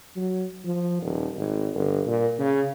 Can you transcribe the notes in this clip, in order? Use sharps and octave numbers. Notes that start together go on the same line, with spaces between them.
F#3
F3
D#1
G#1
G1
A#2
C#3